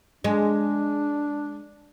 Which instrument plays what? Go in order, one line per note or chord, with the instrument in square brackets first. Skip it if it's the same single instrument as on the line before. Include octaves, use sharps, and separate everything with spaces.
[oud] G#3 [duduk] D4